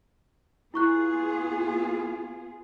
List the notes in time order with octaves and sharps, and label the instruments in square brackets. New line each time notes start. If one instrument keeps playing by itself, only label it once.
[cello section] B3 F4 G#4 [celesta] E4 C#6 F#6